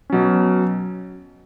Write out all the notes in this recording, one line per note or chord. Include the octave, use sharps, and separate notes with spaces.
B2 F#3 C#4